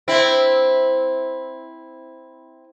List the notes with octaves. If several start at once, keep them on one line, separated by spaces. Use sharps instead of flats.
C4 E4